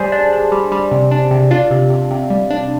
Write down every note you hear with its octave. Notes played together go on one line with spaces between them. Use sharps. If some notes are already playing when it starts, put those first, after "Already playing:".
Already playing: G3 G#4 C5
D4
D4
G3
G3
C3
D4
C3
D4 F4
C3
C3
C3
G3
D4